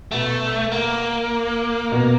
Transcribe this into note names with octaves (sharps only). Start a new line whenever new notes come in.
B2 A3 B3
A#3
B2 B3